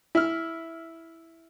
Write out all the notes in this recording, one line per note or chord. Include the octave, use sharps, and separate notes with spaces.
E4 F6